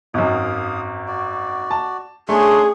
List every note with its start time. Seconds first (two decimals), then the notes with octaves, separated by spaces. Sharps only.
0.14 G#1 F#2 F5 D#6
1.08 F#4 D5
1.71 A5
2.29 A3 C#4 D4 G#4 C6